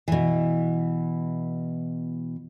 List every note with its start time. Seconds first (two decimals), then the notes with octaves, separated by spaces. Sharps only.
0.08 B2 E3